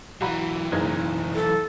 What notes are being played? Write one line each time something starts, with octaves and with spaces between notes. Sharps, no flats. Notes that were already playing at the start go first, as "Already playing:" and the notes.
B1 E3 F#4 A#5 B5
F#1 D#4 G#6
A4